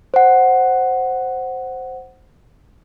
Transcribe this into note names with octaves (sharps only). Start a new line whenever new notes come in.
C5 F#5